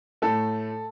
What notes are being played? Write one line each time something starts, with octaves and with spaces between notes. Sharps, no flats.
A2 A3 A4